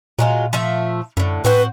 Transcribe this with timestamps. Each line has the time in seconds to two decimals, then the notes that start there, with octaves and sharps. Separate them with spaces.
0.19 A#2 F#3 G#3 F4
0.53 F3 A3 E5
1.17 F#2 A2 D3
1.45 A2 C4 F#4 B4 C5